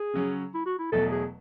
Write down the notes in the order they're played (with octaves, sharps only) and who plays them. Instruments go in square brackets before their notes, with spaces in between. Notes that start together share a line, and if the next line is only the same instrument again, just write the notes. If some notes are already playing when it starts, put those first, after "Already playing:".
Already playing: [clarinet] G#4
[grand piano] C#3 F#3 C#4
[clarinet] E4
F#4
E4
[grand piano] E1 E2 B2 F#3 A3 [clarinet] A4
[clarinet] G#4